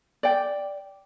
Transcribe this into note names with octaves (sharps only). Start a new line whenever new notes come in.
D5 G5